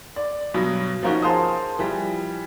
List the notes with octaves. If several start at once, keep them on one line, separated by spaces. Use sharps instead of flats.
D5
G2 B2 F#3
F3 A#3 C#4 D#4 F#4
G#4 A#4 C5 F5 A5 D#6
E3 F3 G3